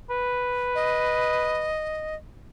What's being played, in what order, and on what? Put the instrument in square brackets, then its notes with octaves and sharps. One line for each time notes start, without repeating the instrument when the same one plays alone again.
[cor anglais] B4
[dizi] D#5